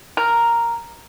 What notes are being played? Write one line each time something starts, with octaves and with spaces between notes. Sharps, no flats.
A#4